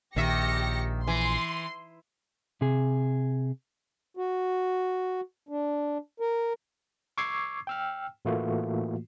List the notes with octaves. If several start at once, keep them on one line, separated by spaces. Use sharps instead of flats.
A#1 D#3 G4 E5 A#6 C#7
E3 C6
C3 G#4
F#4
D4
A#4
C#6 D6 E6 G#6 C7
G5 E6 F6
A2 E3 A3 A#3 F4 F#4